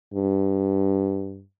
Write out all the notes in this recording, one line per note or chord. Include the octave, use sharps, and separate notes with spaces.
G2